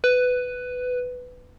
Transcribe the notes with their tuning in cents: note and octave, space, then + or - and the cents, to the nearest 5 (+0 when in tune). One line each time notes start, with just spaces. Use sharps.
B4 +10